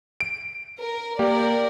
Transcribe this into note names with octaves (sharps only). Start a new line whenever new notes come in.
D7
A#4
A#3 G4 A#4 D5 G5